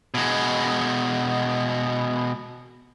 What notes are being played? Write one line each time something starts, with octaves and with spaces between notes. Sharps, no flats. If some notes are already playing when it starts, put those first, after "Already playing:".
B2 G#3